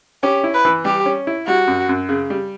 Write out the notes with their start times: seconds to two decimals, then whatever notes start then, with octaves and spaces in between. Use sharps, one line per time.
0.23 C#4 G4
0.44 E4
0.54 B4
0.65 E3
0.85 G3 G4
1.06 C#4
1.27 E4
1.47 G3 F#4
1.67 F#2
1.89 F#2
2.09 C#3
2.30 G3